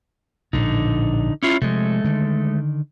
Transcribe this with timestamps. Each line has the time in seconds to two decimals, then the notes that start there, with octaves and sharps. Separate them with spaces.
0.53 A#1 A2 D3 D#4
1.43 C#4 E4 F4
1.62 C3 F3 G#3 A3
2.04 D3 D#3